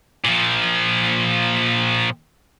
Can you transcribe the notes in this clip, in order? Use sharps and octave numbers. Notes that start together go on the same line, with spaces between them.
A#2 F3